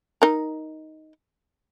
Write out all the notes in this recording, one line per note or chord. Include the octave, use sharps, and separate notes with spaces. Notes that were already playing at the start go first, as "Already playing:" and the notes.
D#4 A#4